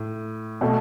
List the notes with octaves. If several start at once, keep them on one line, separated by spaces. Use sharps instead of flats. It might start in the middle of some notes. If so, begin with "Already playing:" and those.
Already playing: A2
B2 A3